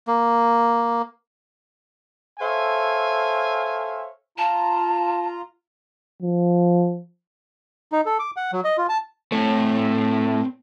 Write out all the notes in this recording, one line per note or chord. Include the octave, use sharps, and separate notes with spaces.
A#3
A4 C5 C#5 E5 F5 G#5
F4 A5 A#5
F3
D#4
A4
D6
F#5
F#3
D#5
F4
A5
A2 A3 C4 C#5